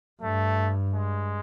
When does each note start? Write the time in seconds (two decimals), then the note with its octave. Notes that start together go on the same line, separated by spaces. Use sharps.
0.21 G2 A3
0.94 G#3